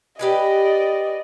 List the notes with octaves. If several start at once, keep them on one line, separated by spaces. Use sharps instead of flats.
G4 B4 D5 D#5 G#5